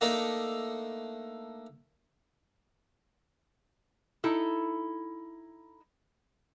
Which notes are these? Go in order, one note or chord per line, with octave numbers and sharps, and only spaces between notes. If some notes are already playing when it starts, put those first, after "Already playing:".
A3 A#3 D4 D#4 A4
D#4 E4 A4